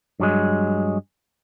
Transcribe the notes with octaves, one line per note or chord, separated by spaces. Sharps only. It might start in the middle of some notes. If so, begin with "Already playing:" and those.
G2 F#3 G#3